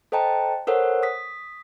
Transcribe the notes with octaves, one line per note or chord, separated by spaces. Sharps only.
A4 C5 D#5 G5 A5 A#5
A4 A#4 C5 C#5 F#5
D#6 B6